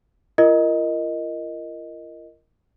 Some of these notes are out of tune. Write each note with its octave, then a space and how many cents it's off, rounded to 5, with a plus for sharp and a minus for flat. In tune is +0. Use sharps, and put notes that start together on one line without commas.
F4 -45 A#4 -5 D#5 +0